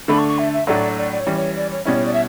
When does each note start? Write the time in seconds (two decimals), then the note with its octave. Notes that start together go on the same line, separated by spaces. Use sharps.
0.08 D3 A3 D4 B5
0.18 C#6
0.28 C#6
0.38 E5
0.53 E5
0.67 A2 F#3 A3 D4 F#4 D5
0.97 D5
1.11 D5
1.19 C#5
1.27 E3 G3 C#4
1.35 C#5
1.56 D5
1.71 C#5
1.85 B2 G3 C#4 E4 D5
1.95 C#5
2.05 D5
2.13 E5